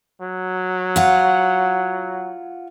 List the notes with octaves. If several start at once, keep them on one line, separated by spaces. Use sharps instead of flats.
F#3
F4 F#5